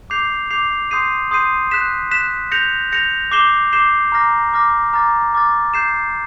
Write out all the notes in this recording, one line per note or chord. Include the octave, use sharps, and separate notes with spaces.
D6 G6 C7 F7
D6 G6 C7 F7
C6 D#6 G6 C7 D#7
C6 D#6 G6 C7 D#7
F#6 B6 E7
F#6 B6 E7
G6 A#6 C#7 F7
G6 A#6 C#7 F7
D6 G6 C7 E7 G7
D6 G6 C7 E7 G7
A#5 D6 F6 A#6
A#5 D6 F6 A#6
A#5 D6 F6 A6
A#5 D6 F6 A6
G6 C7 E7